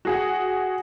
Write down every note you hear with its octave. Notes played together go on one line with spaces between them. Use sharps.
F#4 G#4 F#5